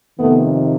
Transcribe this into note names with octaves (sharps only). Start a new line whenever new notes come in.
F2 C3 D#3 A3 B3